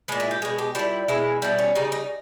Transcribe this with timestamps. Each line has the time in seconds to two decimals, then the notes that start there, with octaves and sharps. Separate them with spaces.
0.08 A#2 G#3 B3
0.20 E4
0.31 G4
0.42 B2 G#3 G#4
0.58 G4
0.75 A#2 G3 E4
1.08 B2 G#3 E4
1.42 B2 G3 E4
1.59 C#4
1.75 C#3 G3 D#4
1.92 D#4